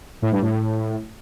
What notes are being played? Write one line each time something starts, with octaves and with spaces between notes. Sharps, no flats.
A2
G2
A2